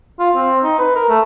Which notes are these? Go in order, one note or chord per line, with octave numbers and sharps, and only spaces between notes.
F4
C4
D#4
B4
A#4
A3